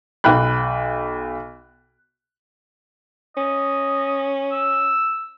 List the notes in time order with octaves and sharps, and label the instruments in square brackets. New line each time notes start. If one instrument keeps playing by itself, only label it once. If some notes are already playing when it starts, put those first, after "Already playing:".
[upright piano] B1 G5 B5 F#6
[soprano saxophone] C#4 [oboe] D#5
[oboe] E6